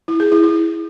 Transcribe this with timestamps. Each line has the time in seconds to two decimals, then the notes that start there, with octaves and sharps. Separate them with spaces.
0.08 E4
0.20 G#4
0.32 E4
0.43 E4